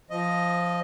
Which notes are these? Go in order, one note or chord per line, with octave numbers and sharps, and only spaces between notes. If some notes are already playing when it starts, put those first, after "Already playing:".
F3 D#5